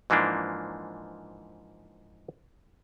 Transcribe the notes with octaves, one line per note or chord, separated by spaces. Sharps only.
G#2 E3 F3 A#3 D4